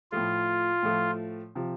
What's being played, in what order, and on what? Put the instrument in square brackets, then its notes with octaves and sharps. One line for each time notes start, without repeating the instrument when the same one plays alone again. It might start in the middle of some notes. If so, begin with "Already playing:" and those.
[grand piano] A2 F3 A3 [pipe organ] F4
[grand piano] A2 F3 A3
C3 F3